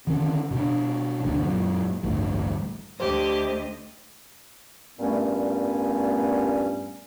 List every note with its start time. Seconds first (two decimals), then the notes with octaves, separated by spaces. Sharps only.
0.07 D3 D#3 C#4
0.51 B2 D4
1.23 F1 D2 A2 D3
1.40 F#2 A#2
2.03 A1 D2 G2
3.00 D2 G4 C5 D#5
4.98 G2 A#2 G3 A3 B3 C#4